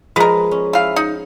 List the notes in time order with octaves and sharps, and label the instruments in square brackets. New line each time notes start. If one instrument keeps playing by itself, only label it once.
[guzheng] F3 G#3 A#5 [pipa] A#4 B4
[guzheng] C#4
[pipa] E3 F5
D#4